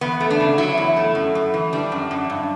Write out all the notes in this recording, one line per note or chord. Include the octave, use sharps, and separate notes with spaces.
E2 B3
A3
D4
C#3
F#3 E4
E2
A3
F#2
F#2
E3
G3 D4
F#2
F#2
G2